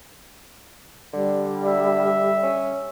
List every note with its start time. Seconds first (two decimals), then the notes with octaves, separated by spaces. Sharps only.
1.13 D3 G3
1.65 E5
2.43 C#4